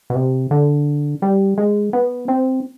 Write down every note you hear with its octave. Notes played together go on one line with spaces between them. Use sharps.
B2
C3
D3
G3
G#3
B3
C4